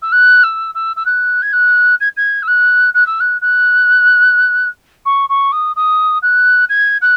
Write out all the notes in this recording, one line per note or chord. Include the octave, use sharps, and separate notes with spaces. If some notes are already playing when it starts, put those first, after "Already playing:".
E6
F#6
E6
E6
E6
F#6
G#6
F#6
G#6
G#6
E6
F#6
F#6
E6
F#6
F#6
C#6
C#6
D#6
D#6
F#6
G#6
F#6